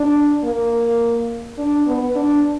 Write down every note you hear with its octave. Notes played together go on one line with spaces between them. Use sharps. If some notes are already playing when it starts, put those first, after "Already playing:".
Already playing: D4
A#3
D4
B3
D4